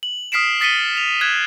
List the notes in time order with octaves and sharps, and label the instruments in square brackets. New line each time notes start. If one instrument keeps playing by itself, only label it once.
[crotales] F#7
D#6 F6 B6 C7 D7 E7
D#6 A6 B6 C#7 D#7 G7
F7
F#6 G#6 D#7 E7